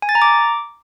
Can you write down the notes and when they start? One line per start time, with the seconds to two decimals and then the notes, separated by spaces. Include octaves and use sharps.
0.02 G#5
0.09 A6
0.15 A#5
0.22 D6